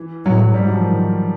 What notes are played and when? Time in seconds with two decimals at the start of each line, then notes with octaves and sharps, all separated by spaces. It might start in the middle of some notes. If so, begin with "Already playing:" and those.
Already playing: E3
0.25 A2 F#3
0.39 F#3
0.54 G#2 G3
0.64 F#3
0.73 F3
0.83 D#3